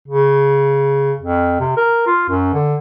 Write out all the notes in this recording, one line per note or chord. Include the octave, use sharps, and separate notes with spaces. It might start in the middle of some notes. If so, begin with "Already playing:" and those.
C#3
F2
C3
A#4
F4
F#2
D3